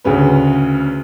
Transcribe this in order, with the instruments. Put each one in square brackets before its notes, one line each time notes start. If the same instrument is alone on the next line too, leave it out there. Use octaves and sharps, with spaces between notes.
[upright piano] D2 C#3 C#4 B4